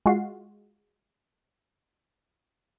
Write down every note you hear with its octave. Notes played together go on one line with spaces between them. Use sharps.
G#3 F4 F#4 C7